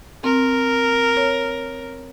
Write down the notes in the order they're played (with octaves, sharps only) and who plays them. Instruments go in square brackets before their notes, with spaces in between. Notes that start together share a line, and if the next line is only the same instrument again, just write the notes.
[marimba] C4 [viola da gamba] A#4
[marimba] C#5